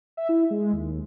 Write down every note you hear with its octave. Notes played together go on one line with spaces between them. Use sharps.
E5
E4
G#3
D#2